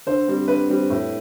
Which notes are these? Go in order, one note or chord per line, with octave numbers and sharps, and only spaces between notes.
D3 C5
G3 C4
D3 B4
G3 C4
A2